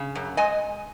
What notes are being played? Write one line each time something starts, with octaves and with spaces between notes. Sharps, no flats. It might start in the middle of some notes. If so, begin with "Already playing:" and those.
Already playing: C#3
F#2
G#3 D#5 G#5